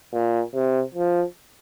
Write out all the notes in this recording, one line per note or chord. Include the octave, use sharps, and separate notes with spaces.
A#2
C3
F3